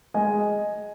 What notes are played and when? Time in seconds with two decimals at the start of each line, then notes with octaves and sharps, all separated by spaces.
0.14 G#3 D#5 G#5